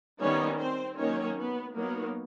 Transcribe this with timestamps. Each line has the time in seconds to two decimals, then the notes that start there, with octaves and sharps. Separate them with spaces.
0.20 D#3 G3 B3 C#4 D#4 C#5
0.59 C4 C5
0.98 D#3 F#3 A#3 C#4 D#4 C#5
1.38 B3 B4
1.76 F#3 A#3 B3 D#4 A#4